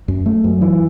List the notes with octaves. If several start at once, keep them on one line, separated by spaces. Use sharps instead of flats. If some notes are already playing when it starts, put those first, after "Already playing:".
F#2
A3
F#2
E3